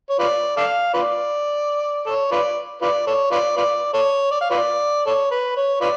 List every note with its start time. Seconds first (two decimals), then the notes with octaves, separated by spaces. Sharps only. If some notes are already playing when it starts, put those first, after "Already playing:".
0.10 C#5
0.19 F4 B4 D5
0.57 A4 D5 F5
0.94 F4 B4 D5
2.06 A4 C#5
2.32 F4 B4 D5
2.82 F4 B4 D5
3.07 A4 C#5
3.31 F4 B4 D5
3.57 F4 B4 D5
3.94 A4 C#5
4.31 D5
4.41 F5
4.51 F4 B4 D5
5.06 A4 C#5
5.31 B4
5.57 C#5
5.81 F4 B4 D5